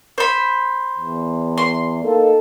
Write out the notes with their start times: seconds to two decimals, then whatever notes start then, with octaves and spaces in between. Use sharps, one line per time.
0.18 C5 B5
0.97 E2
1.58 C6
2.04 A#3 D#4 A4